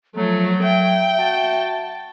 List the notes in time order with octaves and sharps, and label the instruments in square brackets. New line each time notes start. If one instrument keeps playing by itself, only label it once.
[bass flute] F3 [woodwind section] F#3 [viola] A3
[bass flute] E5 [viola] G5
[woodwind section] F#4 A5